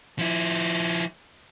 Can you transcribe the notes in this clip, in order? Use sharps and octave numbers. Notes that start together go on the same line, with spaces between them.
F3 E4